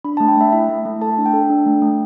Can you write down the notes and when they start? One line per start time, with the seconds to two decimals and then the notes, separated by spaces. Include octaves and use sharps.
0.04 D4 B5
0.17 A3 A5
0.28 G5
0.37 A3 E5
0.52 E4 E5
0.69 A3
0.85 A3
1.01 A4 A5
1.18 D4
1.26 G5
1.34 A4
1.50 D4
1.66 A3
1.82 A3